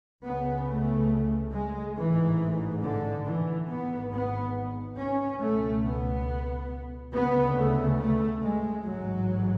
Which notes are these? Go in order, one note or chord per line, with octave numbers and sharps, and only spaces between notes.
C#2 C#3 B3
A3
G#3
A1 G#2 E3
D3
E3
G#1 G#2 B3
B3
C#4
C#2 B2 A3
B3
D2 C#3 B3
A3
A3
G#3
A1 G#2 F#3